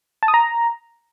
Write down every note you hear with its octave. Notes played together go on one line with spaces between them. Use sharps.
A5
D#6
A#5